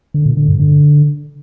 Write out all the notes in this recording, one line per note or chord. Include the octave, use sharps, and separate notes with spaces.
D3
A#2
D3
G2
D3